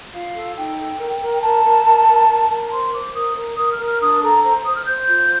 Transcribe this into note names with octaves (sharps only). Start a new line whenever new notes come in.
F4 F5
A4
D#4 G5
A4
A#4
A#4
G5
A#4 A5
A#4
A#4
A#4
A#4
A#4
C5 C6
C5 D6
A#4 D#6
A#4
A#4 D#6
F6
A#4
F6
D4 D#6
A4 A#5
C5 A#5
C5 D#6
F6
C5 G6
F4